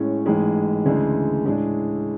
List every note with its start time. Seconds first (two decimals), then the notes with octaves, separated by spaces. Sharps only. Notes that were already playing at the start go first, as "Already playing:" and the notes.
Already playing: A2 G#3 C#4
0.26 A1 G#2 G#3
0.85 D2 C#3 E3 G#3 D4
1.45 A2 G#3 D4 G#4